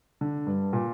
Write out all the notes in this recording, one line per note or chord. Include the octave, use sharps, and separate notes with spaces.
D3
G2
A#2